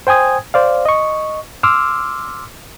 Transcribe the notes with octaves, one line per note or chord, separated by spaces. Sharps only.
C5 G5 G#5 D#6 G#6
C5 D5 F5
D#5 C#6
C6 D6 E6 F6